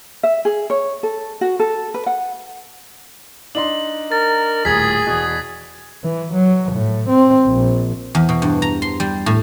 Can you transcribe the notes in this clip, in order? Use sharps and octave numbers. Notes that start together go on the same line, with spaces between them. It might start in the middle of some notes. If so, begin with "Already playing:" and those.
E5
G#4
C#5
A4
F#4
A4
B4
F#5
D4 D#4 C6 F#7
A#4 A6
D#1 A2 G#4 D#6 G#6 B6
E2 B2
E3
F#3
A2
C4
A#1
E2
B2
G2
A#5
C6
G3
A2